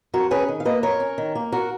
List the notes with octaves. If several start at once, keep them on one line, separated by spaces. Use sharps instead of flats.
F2 F#4 A#4
C#4 G#4 B4
D#3
F5
A#3 B4 D#5
F2 A#4 C#5
C#4
D#3
A#3
F#4 A#4